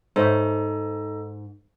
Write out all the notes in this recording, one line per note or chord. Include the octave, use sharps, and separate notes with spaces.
G#2 D#4 A4 C5 C#5 D#5 E5